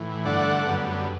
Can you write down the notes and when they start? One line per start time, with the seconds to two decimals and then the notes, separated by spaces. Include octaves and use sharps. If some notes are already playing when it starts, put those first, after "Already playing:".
Already playing: A2 E3
0.25 G2 D3 A3 D5 F#5
0.67 F#2 D3 G3 B3